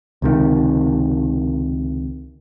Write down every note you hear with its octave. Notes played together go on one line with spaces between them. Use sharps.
C#2 C3 D#3